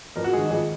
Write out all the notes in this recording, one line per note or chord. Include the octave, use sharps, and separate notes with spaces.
F2 A#4
F#4
D#3 G#3 G#4
F2 G#4